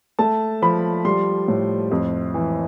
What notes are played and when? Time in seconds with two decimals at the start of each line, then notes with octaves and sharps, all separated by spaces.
0.19 A3 A5
0.62 F3 B5
1.05 G3 C6
1.48 A2
1.91 F2
2.34 E3